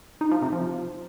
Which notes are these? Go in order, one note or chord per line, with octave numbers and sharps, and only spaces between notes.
D#4
F3
C3
F3